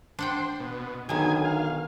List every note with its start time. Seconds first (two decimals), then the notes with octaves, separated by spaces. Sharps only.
0.19 D4 C5 F#5 G5
0.60 B2
1.09 B1 D3 D#3 G#4 G#5
1.44 F5